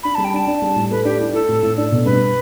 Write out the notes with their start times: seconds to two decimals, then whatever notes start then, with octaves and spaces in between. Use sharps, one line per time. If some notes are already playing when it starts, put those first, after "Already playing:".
0.03 D4 B5
0.15 G3 A5
0.24 G5
0.33 D4 A5
0.47 D4
0.62 G3
0.76 A2
0.90 A3 B4
1.05 D4 G4
1.19 E4
1.33 E4 A4
1.49 A2
1.63 A2
1.77 D4 A4
1.92 B2
2.05 G2 B4